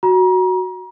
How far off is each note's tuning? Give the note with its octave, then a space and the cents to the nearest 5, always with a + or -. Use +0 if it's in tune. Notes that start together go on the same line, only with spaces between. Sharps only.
F#4 +0 A#5 +35